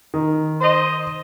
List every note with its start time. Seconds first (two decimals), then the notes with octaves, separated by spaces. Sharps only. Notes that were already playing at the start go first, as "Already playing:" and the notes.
0.14 D#3
0.61 C5 D#5